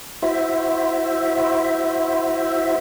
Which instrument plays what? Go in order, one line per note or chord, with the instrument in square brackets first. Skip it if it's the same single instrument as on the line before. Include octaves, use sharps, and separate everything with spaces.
[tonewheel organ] E4 F#4 C5 E5